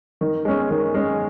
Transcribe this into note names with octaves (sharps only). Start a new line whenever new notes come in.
D#3
G#3 C#4
D#3
G#3 C#4